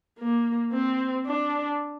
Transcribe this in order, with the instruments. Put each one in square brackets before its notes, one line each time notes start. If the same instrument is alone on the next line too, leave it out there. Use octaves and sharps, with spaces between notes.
[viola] A#3
C4
D4